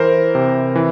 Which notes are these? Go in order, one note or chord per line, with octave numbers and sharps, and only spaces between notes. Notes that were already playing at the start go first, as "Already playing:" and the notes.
Already playing: E3 A#4 C5
C3
E3